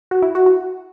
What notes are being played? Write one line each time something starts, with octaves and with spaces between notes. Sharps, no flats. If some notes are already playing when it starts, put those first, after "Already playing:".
F#4
E4
F#4
F#4